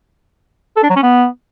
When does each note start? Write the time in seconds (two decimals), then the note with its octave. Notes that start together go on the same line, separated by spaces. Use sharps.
0.76 A4
0.83 D4
0.90 F#3
0.96 C#4
1.03 B3